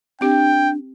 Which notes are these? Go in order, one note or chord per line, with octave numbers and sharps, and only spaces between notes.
C4 D4 G4 G5